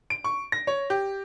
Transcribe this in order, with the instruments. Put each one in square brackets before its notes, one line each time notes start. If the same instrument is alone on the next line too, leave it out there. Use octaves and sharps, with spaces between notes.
[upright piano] D7
C#6
A#6
C#5
G4